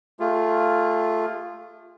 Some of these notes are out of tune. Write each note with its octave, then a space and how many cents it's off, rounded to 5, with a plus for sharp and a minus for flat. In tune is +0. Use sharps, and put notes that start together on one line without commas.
A3 +0 F4 +0 G#4 -40